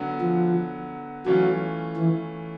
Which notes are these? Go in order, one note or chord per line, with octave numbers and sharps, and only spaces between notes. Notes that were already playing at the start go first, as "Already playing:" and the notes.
Already playing: D3 F#3 B3
F3
E3 F#3 A3 C#4 F4
E3